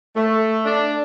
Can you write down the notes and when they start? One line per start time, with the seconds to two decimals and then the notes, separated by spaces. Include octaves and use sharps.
0.16 A3
0.65 D4